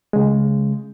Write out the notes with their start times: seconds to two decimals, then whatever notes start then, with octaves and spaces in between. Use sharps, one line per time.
0.13 C#3 G#3